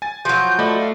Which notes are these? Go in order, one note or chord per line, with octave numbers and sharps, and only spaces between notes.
G#5 A6
F3 F#3 G6
A3 D5 D#5 B5
F5